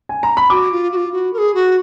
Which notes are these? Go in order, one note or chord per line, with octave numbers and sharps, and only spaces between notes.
G#5
A#5
B5
F#4 D6
F4
F#4
F4
F#4
A#4
G#4
F#4